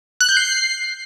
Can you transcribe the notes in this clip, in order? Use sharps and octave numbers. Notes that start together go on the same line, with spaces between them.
F#6
G6
C7